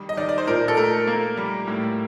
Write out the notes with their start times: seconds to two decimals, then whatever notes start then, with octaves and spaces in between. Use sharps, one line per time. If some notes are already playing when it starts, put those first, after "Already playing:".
Already playing: D#3 G3
0.09 D#5
0.17 D#3 D5
0.29 D5
0.38 C5
0.47 A#2 A#4
0.68 A4
0.77 A3 A#4
1.07 A#3
1.37 G3
1.68 A2